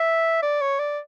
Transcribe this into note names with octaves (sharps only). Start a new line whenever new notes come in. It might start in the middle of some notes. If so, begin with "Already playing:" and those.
Already playing: E5
D5
C#5
D5